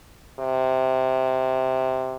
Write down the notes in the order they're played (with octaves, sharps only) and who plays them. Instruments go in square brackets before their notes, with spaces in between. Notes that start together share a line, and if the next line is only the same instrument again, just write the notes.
[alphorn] C3